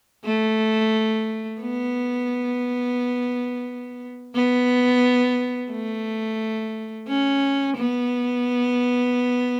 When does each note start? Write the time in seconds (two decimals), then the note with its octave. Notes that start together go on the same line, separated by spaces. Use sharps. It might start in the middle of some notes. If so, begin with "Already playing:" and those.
0.25 A3
1.62 B3
4.35 B3
5.71 A3
7.08 C#4
7.77 B3